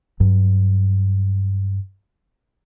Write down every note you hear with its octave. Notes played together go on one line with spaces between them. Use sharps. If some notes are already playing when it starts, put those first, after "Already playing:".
G2 F#3